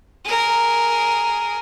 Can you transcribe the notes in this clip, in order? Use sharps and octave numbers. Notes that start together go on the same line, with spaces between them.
G#4 A#4